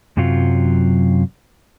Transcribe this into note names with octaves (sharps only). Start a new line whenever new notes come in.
F#2 C3 F#3 F4